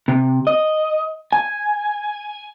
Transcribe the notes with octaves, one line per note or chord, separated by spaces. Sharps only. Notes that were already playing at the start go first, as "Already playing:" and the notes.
C3
D#5
G#5